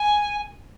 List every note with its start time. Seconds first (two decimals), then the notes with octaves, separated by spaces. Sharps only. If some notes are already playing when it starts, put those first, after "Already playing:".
Already playing: G#5